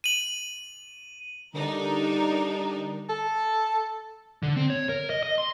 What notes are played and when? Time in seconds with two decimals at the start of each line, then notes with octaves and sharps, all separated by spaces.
0.04 D#7 F#7
1.54 D3 G3 D4 D#4 A#4
3.09 A4
4.43 D3
4.56 C4
4.70 C#5
4.89 A#4
5.10 D#5
5.23 D#5
5.38 C6